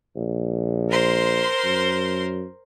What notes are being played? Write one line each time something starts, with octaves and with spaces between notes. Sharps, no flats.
A#1
A#4 C5 C6
F#2